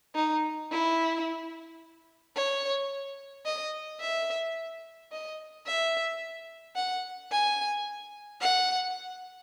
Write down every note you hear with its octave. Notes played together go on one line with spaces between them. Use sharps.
D#4
E4
C#5
D#5
E5
D#5
E5
F#5
G#5
F#5